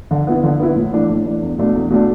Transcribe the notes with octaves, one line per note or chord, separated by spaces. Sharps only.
D3
B3 E4
D3
B3 E4
A2
E3 A3 D4
A2
E3 A3 D4
E2
B2 A3 D4
E2
B2 A3 D4